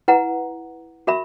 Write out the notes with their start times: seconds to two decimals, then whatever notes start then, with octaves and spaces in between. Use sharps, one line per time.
0.08 E4 B4 F#5 A#5
1.07 F#4 A#4 E5 B5